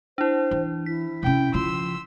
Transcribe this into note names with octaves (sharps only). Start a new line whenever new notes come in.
D4 E4 C5
E3
E4 B6
C3 C#4 G5
C#3 F3 C6 E6